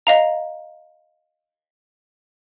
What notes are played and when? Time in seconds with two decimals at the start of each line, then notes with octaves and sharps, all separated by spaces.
0.07 D#5 F5 A#5